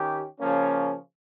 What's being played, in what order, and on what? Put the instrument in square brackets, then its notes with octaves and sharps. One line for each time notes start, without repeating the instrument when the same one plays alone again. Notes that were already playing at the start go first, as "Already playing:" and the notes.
Already playing: [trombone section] D#3 C#4 G4
C#3 F3 A#3 C#4